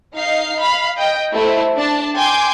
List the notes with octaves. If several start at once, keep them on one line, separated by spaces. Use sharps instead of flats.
D#4 F5 C7
F5 B5
D#5 G5
A3 E4 C5
D4 D5 A5
G5 G#5 C6 D6 G6